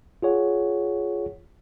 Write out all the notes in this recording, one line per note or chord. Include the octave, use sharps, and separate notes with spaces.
F4 G#4 C#5 F#5